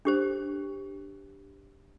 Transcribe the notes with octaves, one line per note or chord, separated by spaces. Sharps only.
D4 G4 C5